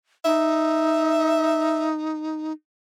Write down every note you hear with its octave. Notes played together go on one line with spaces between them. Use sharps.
D#4 E5